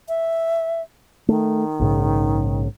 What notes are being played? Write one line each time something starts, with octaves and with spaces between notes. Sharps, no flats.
E5
D#3 A3
A#1 G#2 C#3